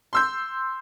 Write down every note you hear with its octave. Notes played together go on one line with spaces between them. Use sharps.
C6 E6 G6